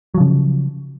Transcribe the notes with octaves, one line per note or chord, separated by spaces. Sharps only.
C#3 F3 F#3